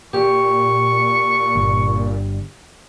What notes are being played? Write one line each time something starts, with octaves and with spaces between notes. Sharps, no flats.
A#2 G4 C#6
G1